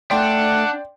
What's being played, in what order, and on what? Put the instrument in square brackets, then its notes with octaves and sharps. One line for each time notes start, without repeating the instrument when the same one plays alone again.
[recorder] A3 [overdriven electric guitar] D4 [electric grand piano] D5 G5 C6 [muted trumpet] F#5